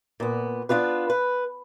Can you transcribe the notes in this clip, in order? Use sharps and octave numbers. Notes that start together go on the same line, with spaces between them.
A#2 B3
B3 D4 F4 G4 B4
B4